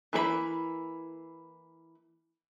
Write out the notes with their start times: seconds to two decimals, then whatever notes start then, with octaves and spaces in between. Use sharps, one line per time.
0.13 E3 A#3 G#4 B5